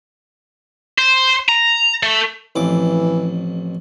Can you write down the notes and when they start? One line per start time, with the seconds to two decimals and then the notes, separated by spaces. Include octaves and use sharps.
0.98 C5
1.49 A#5
2.03 A3
2.56 A1 F2 E3 D6